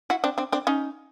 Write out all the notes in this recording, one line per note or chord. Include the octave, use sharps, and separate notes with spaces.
E4 F#4
C4 D4
C4 D4
C4 D4
C#4 D#4